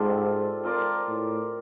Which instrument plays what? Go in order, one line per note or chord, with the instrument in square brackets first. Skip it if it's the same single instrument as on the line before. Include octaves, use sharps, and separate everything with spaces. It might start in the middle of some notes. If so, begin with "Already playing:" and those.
Already playing: [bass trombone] G#2 [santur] G3 C4 D4 F4 A4
[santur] C4 F4 A#4 D5
[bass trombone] A2